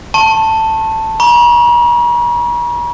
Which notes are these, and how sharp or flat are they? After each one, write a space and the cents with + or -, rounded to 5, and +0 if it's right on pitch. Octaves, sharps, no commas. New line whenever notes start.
A5 +10 C#6 -45
A#5 +45 C#6 +0